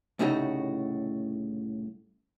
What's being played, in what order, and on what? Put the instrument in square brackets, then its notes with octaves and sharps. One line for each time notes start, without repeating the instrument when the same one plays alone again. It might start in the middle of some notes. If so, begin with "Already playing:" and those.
[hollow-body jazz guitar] C2 A2 C#3 A3 D#4 F#4